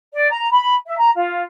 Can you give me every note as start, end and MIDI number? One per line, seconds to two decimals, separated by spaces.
0.14 0.28 74
0.31 0.49 82
0.51 0.74 83
0.85 0.95 76
0.97 1.10 82
1.15 1.41 65